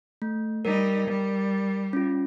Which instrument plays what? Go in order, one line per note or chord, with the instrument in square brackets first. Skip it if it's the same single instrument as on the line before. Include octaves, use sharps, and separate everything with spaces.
[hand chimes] A3
[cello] G3 D#4 [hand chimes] A#4
[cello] G3
[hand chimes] C#4 F4